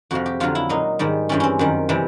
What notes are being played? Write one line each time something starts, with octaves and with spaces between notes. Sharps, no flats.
F2 C3 F3 F#4
G4
F2 D3 F#3 F4
E4
A#2 F#3 D#4
G#2 D#3 G3
G2 E3 G3 C#4
C4 C#4
F#2 D#3 G3
C3 E3 G3